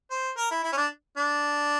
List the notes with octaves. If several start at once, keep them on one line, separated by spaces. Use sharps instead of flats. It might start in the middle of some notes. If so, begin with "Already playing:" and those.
C5
A#4
E4
E4
C#4
D4
D4